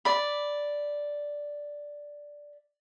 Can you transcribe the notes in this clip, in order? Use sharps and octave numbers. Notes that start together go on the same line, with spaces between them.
D5 B5